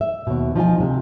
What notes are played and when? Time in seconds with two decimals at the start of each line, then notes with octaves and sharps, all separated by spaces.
0.01 E5
0.27 D#2 B2
0.56 F3 D#4 F4 G#5
0.77 D2 C3